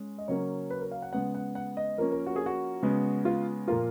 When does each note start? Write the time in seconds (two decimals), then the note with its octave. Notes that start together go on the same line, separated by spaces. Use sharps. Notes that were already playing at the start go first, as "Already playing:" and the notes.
Already playing: G#3 C#4
0.18 D#5
0.28 C#3 F#3 A#3 C#4 C#5
0.70 B4
0.81 A#4
0.91 F5
1.02 F#5
1.13 C#3 G#3 B3 F#5
1.35 F#5
1.55 F#5
1.77 D#5
1.98 F3 A#3 C#4 A#4
2.12 A#4
2.26 F#4
2.36 G#4
2.46 F#4
2.83 C#3 G#3 B3
3.25 F4
3.68 A#2 F3 A#3 F4